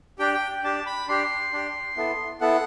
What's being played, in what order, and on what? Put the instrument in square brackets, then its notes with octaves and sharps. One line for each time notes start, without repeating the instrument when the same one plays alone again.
[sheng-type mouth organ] D4 G4 G5
G5
D4 G4 A5
B5
D4 G4 C6
D4 G4
B3 E4 A4
B3 E4 A4 F#5